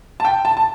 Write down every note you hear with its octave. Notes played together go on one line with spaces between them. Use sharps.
A5
G5
A5
A5